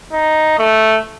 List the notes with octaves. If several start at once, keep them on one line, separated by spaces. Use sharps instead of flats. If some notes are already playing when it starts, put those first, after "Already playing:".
D#4
A3